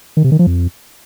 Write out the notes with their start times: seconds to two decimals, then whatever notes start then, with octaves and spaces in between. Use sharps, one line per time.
0.17 D#3
0.24 C3
0.32 D#3
0.39 F3
0.47 F2